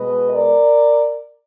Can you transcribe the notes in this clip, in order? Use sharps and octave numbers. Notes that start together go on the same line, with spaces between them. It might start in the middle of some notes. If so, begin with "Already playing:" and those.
Already playing: B2 G#3 B3 B4 D#5
A#4 D5